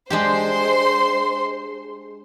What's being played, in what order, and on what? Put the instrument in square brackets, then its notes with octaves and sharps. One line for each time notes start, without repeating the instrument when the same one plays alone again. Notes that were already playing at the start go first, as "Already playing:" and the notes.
[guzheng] G#3 D4 G4 [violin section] C5 C6